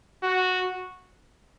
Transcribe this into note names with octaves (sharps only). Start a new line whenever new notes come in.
F#4